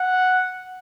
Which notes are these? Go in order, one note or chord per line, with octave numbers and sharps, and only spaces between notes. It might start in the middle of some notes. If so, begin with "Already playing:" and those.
Already playing: F#5